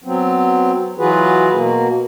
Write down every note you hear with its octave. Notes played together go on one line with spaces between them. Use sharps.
F#3 B3 C4
E3 F#3 F4 F#4 G#4 B4
B2 A#3